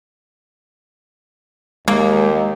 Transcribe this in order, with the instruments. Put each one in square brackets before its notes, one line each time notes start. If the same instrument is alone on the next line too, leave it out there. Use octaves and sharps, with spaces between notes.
[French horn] D#2 [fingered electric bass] G#3 [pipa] A#3